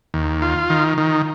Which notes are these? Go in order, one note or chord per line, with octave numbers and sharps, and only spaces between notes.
D#2
F4
D#3
D#3